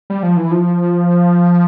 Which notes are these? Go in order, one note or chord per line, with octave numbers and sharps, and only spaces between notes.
G3
F3
E3
F3